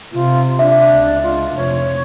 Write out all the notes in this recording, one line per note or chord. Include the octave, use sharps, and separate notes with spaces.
C3 F4
D4 E5
C#2
F4
F1 C#5